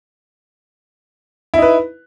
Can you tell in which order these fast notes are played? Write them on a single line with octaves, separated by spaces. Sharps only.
E4 D#4 B4